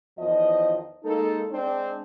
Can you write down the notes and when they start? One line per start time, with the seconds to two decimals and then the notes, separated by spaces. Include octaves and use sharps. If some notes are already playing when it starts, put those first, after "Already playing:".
0.18 E2 D#3 F3 D#5
1.04 G#3 A#3 D#4 A4
1.51 G#3 C4 D4